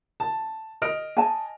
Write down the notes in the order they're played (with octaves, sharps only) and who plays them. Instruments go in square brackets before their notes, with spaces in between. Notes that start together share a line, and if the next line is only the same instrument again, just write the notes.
[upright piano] A5
D#5 F6 D7
[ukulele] G#5 A5